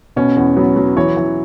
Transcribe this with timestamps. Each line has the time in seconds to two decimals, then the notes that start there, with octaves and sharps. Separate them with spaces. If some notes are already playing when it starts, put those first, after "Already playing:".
0.16 B2 C#4
0.36 E2
0.56 F#3 B3
0.76 F#3
0.96 E3 C#5
1.17 E3